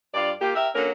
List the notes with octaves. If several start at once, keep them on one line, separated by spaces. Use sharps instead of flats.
G2 F4 D5
A#3 F4 G4
G4 A#4 E5
D3 F#3 A#3 C#4 A#4